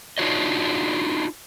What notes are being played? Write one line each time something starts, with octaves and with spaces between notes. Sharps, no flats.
D4 D#4 F4 F#4 C#5 D#5